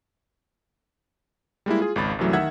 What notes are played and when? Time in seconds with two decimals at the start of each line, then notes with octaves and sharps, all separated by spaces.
1.66 G3 G#3 A#3 E4
1.80 F4 G#4
1.96 G#1 C#2 B5 A6
2.19 C2 F#2 E3 F#3 A3
2.33 D#3 E5 F#5 E6 G#6